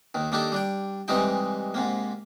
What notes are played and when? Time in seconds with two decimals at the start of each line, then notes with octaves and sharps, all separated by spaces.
0.14 D#2 D#3
0.32 D#3 A#3 D4 D#4 G4 A4
0.52 G3 D4 G5
1.08 C3 E3 G3 G#3 D#4 G5
1.74 G#2 C3 A#3